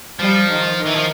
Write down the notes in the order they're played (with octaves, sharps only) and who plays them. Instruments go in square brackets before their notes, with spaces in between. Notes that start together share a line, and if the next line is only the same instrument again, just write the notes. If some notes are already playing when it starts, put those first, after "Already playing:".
[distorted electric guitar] F3 [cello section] G3
[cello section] D#3
D#3
[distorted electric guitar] E3
F3